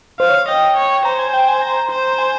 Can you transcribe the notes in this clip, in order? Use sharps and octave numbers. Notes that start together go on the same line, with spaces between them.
C5 F5
C#5
D#5 G5
C#5
C5 A#5
G#5
G5
G#5
A#5
C5
G#5